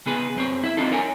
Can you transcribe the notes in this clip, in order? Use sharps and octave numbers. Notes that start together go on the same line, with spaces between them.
C#3 B3 G#4 B4
F#2 C4 C#5
E4 E5
C4 D4 D#4 F4 A4
A#4 C#5 G#5